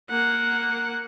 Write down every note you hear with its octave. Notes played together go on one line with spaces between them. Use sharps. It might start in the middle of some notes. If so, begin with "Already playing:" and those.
A#3 F#5